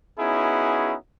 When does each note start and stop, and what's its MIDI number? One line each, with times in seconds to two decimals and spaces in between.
0.19 0.95 59
0.19 0.95 61
0.19 0.95 63
0.19 0.95 64
0.19 0.95 66
0.19 0.95 68